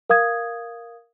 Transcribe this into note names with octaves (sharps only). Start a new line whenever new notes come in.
A#4 F5 D#6 G#6